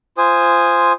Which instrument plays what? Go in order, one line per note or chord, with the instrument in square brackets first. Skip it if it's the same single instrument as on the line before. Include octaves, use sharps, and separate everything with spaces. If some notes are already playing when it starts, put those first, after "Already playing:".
[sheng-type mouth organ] F4 C5 G#5 D#6